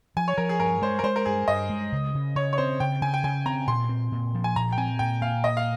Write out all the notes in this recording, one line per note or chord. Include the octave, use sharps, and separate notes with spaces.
F3 G#5
C#5
F3 A#4
G#4
G2 A#4
G#3 C5
A#4
G#3 C5
A#4
G2 G#4
G2 D#5
G#3
C#3
C#3
C#3 C#5
C#5
C4 C5
C#3 G5
C#3 G#5
G5
C#3 G#5
C4 A#5
A#2 C6
C4
A#2
F3
G#5
A#2 A#5
G5
C4 G#5
A#2 G5
A#2 F5
A#3 D#5
F5